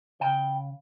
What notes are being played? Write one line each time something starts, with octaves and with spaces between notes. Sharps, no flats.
C#3 G5